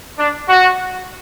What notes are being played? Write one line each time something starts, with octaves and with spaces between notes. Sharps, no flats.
D4
F#4